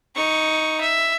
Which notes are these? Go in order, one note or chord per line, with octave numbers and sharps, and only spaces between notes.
D#4 C#6
E5